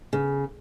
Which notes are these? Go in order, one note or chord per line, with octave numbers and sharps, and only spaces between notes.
C#3